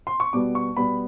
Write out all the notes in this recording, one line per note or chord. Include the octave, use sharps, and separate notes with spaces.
C6
C#6
B2 G3 B3 D6
C#6
B2 G3 B3 B5